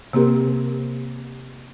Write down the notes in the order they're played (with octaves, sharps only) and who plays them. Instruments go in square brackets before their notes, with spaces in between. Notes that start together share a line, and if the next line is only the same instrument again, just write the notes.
[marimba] C3 A#3 C4 G4 A#4